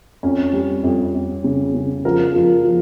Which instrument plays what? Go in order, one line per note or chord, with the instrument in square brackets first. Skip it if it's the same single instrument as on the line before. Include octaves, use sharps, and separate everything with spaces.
[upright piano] F2 C#4
G3
F2
F2
C#3
C#3
F3 A#4
F3
F3